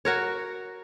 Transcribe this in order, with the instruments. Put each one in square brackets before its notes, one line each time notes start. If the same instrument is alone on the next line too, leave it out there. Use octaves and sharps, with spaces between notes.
[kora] F#4 A#4 C#5